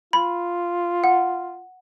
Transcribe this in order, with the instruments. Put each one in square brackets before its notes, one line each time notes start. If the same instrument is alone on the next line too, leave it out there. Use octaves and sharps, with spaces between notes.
[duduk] F4 [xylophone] B5
[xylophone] F#5